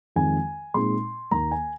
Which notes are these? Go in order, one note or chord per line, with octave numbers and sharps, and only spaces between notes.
F2 D#3 G#3 C4 G#5
A#2 G#3 C4 D#4 C6
D#2 D#3 A#3 A#5
G#5